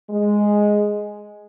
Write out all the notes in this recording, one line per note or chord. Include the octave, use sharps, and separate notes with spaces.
G#3